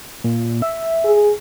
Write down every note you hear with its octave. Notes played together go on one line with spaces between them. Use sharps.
A#2
E5
G#4